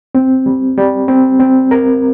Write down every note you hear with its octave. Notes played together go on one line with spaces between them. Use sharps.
C4
G3
G3
C4
C4
A#4